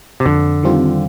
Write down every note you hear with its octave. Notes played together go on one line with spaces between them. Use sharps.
C3
F2 D3
D#3 G3 C4 F4